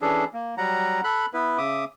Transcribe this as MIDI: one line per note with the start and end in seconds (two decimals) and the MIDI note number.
0.02 0.24 52
0.02 0.24 61
0.02 0.24 62
0.02 0.24 68
0.02 0.24 69
0.34 0.55 58
0.58 1.01 54
0.58 1.01 55
0.58 1.01 78
0.58 1.01 82
1.04 1.26 69
1.04 1.26 83
1.04 1.26 90
1.34 1.58 59
1.34 1.58 64
1.34 1.58 71
1.58 1.84 49
1.58 1.84 76
1.58 1.84 86
1.58 1.84 87